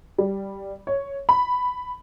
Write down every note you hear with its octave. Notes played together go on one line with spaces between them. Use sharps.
G3
C#5
B5